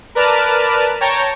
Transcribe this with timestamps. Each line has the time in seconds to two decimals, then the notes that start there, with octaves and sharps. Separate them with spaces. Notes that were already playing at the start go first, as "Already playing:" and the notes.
0.15 A#4 B4 D5 A5 F6
1.01 C#5 G5 A5 A#5 C#6